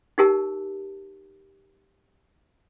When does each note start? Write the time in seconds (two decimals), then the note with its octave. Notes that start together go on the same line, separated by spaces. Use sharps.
0.18 D#4 G4 A#4 A5